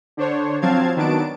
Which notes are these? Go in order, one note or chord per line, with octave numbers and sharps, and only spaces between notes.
D3 D4 C5 C#5
F3 F#3 C4 F5 A5 G#6
D#3 F#3 B3 D4 A5 D7